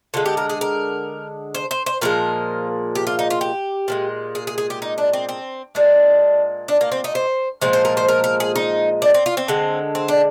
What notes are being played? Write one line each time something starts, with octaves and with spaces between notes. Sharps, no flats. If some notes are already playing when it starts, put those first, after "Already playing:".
D3 G#3 F4
G4
A#4
G#4
A#4
C5
C5
C5
A#2 F3 G#3 A#4
G4
F4
D#4
F4
G4
A#2 F3 G#3
G#4
G#4
G#4
G4
D#4
D4
C4
C4
A#2 G#3 D4
D4
A#3
C4
D#4
C5
A#2 F3 G#3 C5
C5
A#4
C5
A#4
A#4
G#4
D#4
D4
C4
F4
C4
D3 G#3
C4
D4